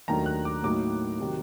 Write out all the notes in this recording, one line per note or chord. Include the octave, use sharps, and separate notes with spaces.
D#2 D#3 F#3 A3 D4 A#5
F#6
D6
A2 F#3 A#3 D#4 D6
C3 D#3 F#3